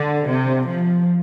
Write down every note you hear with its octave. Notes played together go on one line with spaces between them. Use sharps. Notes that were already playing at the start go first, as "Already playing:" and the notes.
Already playing: D3
C3
F3